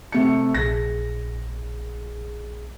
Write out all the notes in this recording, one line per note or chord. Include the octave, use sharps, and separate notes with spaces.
C3 A3 C#7
A#1 G#4 A#6